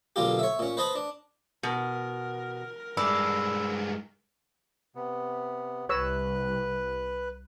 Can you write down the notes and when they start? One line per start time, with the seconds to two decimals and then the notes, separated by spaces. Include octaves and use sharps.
0.16 B1 D3 A#3 F4 G4
0.39 C#5 E5
0.59 A#2 C#4
0.77 B4 C5 D#5 A5 B5
0.95 D4
1.63 B2 A#4
2.97 G2 G#3 D5 B5 E6
4.95 C3 B3
5.89 C2 B4 C#5 E6 F#6